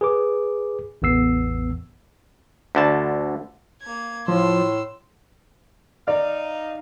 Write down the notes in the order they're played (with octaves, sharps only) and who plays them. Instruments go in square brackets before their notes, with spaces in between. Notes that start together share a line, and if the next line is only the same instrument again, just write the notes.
[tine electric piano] G#4 B4 D6
A1 E2 B3 E6 C7
[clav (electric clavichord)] D2 D3 A5
[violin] A#3 G#6
[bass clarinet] A2 [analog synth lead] F3 [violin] C6 E6
[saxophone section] D#4 F5 [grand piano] D5